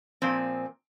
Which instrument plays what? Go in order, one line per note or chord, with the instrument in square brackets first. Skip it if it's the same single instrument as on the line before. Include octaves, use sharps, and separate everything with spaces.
[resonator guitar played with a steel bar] A#2 F3 C4